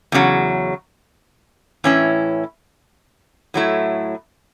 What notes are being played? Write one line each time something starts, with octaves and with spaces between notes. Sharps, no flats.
E2 C#3 F#3
A2 E3 C#4 E4
A2 F#3 A3 E4